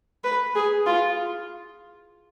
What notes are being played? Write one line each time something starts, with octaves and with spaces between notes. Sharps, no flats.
B4
G#4
F4